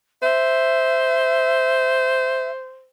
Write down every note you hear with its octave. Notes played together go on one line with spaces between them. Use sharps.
C5 E5